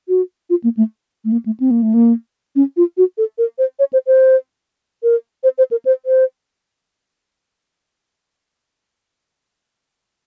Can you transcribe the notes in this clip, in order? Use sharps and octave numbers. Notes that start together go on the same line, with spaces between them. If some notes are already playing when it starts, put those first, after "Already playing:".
F#4
F4
A#3
A3
A3
A#3
A3
C4
A#3
A3
A#3
C#4
F4
F#4
A4
A#4
C5
C#5
C5
C5
A#4
C5
C5
A#4
C5
C5